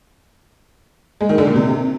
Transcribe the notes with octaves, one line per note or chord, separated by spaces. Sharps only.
G#3
D#3
D3
A#2
C3